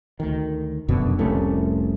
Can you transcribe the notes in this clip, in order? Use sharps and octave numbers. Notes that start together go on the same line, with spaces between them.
D2 D#3
F1 F#2 B2 D3
F1 C2 A3 C#4